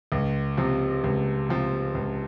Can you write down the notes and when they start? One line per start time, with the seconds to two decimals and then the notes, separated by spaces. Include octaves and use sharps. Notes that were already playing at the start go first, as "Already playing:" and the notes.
0.12 C#2
0.57 C3 F3
1.04 C#2
1.49 C3 F3
1.95 C#2